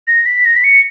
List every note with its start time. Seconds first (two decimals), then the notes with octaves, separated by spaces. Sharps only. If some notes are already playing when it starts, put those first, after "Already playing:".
0.07 A#6
0.26 B6
0.45 A#6
0.56 B6
0.64 C#7